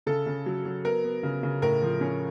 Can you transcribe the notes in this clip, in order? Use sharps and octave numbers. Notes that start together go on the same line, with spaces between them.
C#3 A4
C#3
F#3
F#3
B3 A#4
B3
C#3
C#3
A2 A#4
F3
C#4